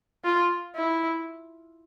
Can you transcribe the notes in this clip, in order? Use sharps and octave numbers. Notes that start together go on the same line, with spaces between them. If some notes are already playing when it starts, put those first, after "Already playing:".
F4
E4